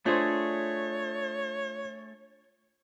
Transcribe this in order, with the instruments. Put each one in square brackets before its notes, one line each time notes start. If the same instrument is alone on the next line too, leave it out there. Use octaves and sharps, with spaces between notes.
[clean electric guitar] A3 G#4 [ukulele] D4 C5 [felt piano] F4 [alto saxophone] C#5